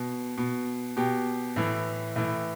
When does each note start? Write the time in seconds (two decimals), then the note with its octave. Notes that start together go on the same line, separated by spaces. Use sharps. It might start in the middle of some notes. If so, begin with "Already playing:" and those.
Already playing: B2
0.38 B2
0.97 B2 G4
1.56 A2 E3
2.16 A2 E3